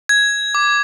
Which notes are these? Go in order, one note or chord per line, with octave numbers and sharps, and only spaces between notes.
G#6
D6